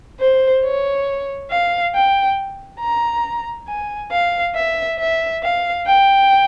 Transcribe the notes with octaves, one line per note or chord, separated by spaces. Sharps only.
C5
C#5
F5
G5
A#5
G#5
F5
E5
E5
F5
G5